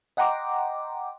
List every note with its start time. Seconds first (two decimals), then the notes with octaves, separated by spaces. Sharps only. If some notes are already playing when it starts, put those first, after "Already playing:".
0.17 D#5 F#5 G5 A#5 C6 D6